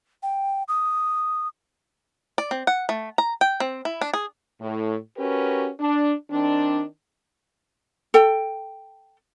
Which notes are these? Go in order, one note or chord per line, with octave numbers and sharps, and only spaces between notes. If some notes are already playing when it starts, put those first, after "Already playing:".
G5
D#6
D5
C4
F#5
A3
A#5
G5
C4
E4
D4
G#4
A2
C#4 F#4 G4 A#4 B4
D4
D#3 C4 D4
A4 G5